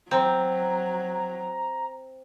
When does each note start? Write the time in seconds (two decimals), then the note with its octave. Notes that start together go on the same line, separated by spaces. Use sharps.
0.11 F#3 C4 A#5